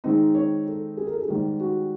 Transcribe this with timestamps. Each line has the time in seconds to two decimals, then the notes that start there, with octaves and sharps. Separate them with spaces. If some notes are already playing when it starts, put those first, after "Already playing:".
0.04 D#3 G#3 C4 D#4
0.35 C#5
0.67 A4
0.97 G#4
1.07 A#4
1.13 A4
1.21 G#4
1.28 G#2 D#3 G3 G4
1.60 F#4